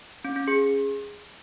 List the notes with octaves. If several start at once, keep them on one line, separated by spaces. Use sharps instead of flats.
C#4
C#4
G#4